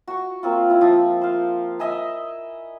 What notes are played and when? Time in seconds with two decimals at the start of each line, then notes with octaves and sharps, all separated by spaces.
0.07 F#4 C#6
0.43 A#3 C4 F4
0.70 E4
0.81 F3
1.21 C5 F5
1.79 D#5 E5 G#5 B5